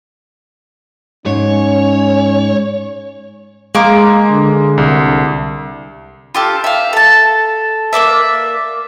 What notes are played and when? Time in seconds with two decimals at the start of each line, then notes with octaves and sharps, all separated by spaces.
1.26 G#2 C#4 C#5
3.75 G#3 A#3 A#4 D6
4.30 D3
4.78 C2
6.34 F4 G4 A4
6.64 E5 F5
6.93 A4 A5
7.93 A#3 B3 D5 E5